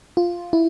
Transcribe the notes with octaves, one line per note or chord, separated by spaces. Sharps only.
F4
E4